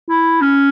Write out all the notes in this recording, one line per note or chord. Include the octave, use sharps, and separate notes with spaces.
E4
C#4